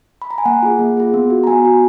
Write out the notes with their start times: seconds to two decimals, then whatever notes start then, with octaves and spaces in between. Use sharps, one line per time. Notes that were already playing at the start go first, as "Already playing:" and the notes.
0.22 B5
0.31 A#5
0.38 G#5
0.45 A#3 F#5
0.63 F4 G#4
0.79 A#3
0.97 F4 G#4
1.14 B3
1.30 F#4
1.44 A#5
1.47 B3 G#5
1.65 F#4